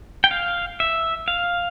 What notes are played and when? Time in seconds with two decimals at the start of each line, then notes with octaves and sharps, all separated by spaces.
0.24 G5
0.31 F5
0.80 E5
1.28 F5